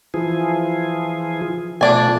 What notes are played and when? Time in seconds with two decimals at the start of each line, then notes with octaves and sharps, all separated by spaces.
0.14 E3 F3 G#4
1.81 B2 F3 A3 D4 D5 G#5